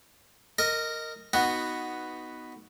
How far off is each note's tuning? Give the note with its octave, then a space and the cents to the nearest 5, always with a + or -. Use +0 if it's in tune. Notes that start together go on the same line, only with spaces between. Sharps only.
A#4 -15 D#5 +0
B3 +0 D#4 +0 F#4 +0